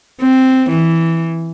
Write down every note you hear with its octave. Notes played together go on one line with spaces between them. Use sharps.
C4
E3